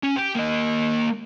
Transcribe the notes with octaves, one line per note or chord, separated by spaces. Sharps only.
C#4
G4
A#3 D#5